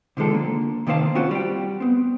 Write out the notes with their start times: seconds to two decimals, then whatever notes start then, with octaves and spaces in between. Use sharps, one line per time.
0.17 C3 D#3 F3 G#3 A4
0.32 D3 A#3
0.87 C3 D#3 A#3 C5 F5 A5
1.15 C4 C#4 F4 F#4 C5
1.31 G3 G5
1.80 B3 C4